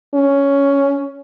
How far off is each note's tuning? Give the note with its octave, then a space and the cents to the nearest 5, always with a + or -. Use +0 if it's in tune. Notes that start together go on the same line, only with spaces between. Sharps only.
C#4 +10